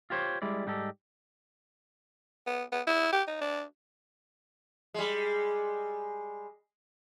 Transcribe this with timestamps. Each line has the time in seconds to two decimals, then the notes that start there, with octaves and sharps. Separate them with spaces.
0.10 F4 G4 C5 C#5
0.42 G3 G#3 E4 D5
0.66 G#2 G3 D#4 G4 A4
2.47 B3
2.72 B3
2.87 E4
3.13 G4
3.27 D#4
3.41 D4
4.94 G3 G#3